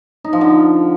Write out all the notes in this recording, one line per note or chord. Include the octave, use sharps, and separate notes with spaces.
D#4
F3
D3